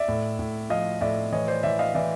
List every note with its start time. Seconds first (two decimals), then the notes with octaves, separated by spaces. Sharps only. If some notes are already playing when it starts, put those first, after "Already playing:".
Already playing: D5 E5
0.08 A2
0.39 A2
0.70 F3 D#5 F5
1.01 A2 D5 E5
1.32 E3 C#5 D#5
1.48 C5 D5
1.63 E3 D5 E5
1.79 D#5 F5
1.94 E3 D5 E5